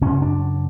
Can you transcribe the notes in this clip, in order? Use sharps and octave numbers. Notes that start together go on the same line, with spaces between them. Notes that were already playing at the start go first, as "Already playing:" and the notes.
F#2 C#3 C#4
D4